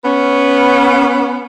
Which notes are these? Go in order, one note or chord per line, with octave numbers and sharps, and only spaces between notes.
B3 C#4